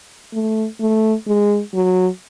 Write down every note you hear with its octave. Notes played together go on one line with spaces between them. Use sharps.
A3
A3
G#3
F#3